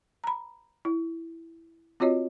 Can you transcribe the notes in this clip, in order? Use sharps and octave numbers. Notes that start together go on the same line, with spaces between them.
A#5 B5
E4
C4 F4 F#4 C#5 D#5